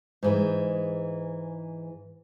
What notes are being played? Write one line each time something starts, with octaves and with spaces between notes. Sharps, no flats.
G#2 E3 G#3